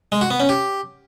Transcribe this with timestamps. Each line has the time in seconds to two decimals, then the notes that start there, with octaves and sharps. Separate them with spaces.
0.12 G#3
0.21 F#4
0.31 B3
0.40 C#4
0.49 G4